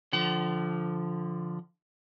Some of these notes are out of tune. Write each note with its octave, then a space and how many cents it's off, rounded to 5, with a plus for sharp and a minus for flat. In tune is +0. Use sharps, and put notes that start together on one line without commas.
D3 +0 F3 +0 F#5 +45